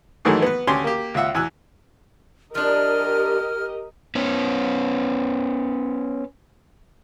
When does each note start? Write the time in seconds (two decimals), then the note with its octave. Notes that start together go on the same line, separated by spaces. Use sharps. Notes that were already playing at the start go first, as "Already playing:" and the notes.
0.25 G#2 D#3 E3 F#3 G#3 A3
0.42 B3 B4
0.67 D2 C#4 G4 G#5 C6
0.84 A#3 G4
1.14 C#2 F4 E5 F#5
1.35 E2 G#5 E6 F#6
2.55 F3 D4 G4 A#4 D#5 F6
4.15 B3 C#4